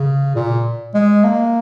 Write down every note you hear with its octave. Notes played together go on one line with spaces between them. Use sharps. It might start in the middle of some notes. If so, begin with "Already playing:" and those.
Already playing: C#3
A#2
G#3
A#3